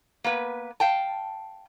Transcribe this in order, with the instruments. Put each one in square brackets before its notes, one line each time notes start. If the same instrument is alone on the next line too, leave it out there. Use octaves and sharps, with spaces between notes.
[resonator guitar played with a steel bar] A#3 B3 B4
F5 G5 A5